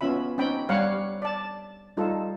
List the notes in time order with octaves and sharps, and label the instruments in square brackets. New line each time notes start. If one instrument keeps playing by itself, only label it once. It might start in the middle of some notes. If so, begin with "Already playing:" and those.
[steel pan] B3 C#4 F4 E5 B5
C4 C#4 D#4 G5 B5
G3 C#5 F5 F#5
D5 A5
G3 D#4 F4 A4